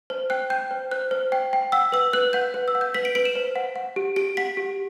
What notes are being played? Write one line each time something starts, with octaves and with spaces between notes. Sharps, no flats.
C5
G5 F#6
G5 G6
C5
C5 F#6
C5
G5
G5
F#5 E6
B4 E6
B4 F#6
F#5 G6
B4
E6
F#5
G6
B4 B6
D7
B4 D7
E7
C5
F#5
F#5
G4
G4 D7
F#5 B6
G4